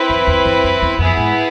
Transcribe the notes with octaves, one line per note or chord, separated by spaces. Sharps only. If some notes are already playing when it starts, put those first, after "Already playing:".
Already playing: C4 E4 B4
F2
E2
F2
F2
E2
F2 B3 E4 G#4
G#2